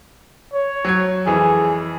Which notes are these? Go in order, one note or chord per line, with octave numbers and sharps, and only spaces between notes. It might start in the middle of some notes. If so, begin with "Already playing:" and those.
C#5
F#3 G#6
F2 E3 G#4